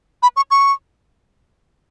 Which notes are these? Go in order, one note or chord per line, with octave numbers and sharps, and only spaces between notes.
B5
C#6
C#6